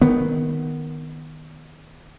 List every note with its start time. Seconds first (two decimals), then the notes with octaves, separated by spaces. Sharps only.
0.02 D#3 B3